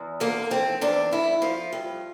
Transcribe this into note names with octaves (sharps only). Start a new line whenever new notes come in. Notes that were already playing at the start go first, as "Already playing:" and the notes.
Already playing: E2
D3 A#3
F3 C4
E2 D4
G2 E4
F3 F4
G2